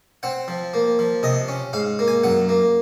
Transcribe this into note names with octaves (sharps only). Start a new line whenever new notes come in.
C4 F#5
F3
A#3
F3
C3 D#5
C#4
G#2 F5
A#3
G#5
F#2 F#5
A#3